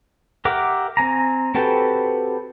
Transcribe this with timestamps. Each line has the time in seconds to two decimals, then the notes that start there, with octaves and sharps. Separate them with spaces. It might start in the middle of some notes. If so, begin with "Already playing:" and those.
0.45 G4 A#4 E5 F#5 D6
0.97 C4 G#5 A#5
1.55 C4 F#4 G4 A4 B4